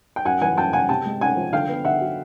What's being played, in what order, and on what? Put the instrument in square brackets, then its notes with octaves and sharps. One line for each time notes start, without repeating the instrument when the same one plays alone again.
[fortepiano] G5
F#2 F#5 G#5
E3 F#5 G#5
F#2 G5 A5
C#3 F#5 G#5
C3 G5 A5
G#3
C#4 F#5 G#5
F3
D3 F5 G5
B3
D3 E5 F#5
F#3